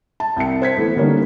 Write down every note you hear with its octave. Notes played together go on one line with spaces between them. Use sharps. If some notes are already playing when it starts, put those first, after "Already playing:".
A5
C2 G5 A5 C#7
C5 G#6 B6
E3 A3 B3
D3 G3 A#3 C#4 D#4